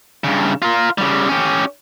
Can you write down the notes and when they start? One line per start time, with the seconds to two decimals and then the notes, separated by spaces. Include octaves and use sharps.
0.24 G2 C#3
0.62 F4 A#4
0.98 C#3 G3
1.29 C#4 G4